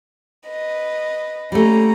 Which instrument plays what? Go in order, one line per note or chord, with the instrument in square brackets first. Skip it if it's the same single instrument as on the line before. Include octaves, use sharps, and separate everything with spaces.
[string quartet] B4 D#5
[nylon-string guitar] G3 A3 [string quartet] A#3 C#4 A#5